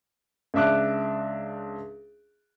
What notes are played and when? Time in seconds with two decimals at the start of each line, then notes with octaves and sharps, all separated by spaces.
0.54 C#2 D4 E5 D6 F#6